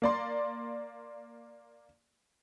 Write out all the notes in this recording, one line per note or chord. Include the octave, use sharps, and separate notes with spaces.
A#3 D5 C6